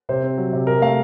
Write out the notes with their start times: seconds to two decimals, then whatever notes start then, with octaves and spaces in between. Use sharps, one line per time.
0.09 C3 C5
0.23 C4
0.38 F#3
0.53 C3
0.67 C3 A#4
0.82 A3 F5